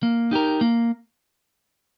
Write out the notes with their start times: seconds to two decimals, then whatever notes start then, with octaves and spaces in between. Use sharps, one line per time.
0.03 A#3
0.31 D#4 G4 A#4
0.61 A#3